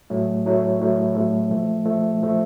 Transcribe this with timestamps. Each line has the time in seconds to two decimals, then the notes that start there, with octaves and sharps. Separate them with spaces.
0.10 A2 F#3 A3
0.45 A2 F#3 A3
0.80 A2 F#3 A3
1.15 A2 F#3 A3
1.50 A#2 F3 A3
1.85 A#2 F3 A3
2.20 A#2 F3 A3